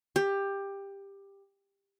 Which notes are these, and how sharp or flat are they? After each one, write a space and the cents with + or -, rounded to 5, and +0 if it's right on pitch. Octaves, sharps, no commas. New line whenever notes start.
G4 +15